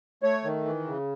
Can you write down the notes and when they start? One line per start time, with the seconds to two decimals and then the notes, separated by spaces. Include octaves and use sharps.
0.23 A3 C#5
0.44 D#3
0.65 E3
0.87 C#3